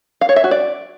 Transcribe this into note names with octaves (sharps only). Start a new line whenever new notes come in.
F5
C#5
E5
F#4
D5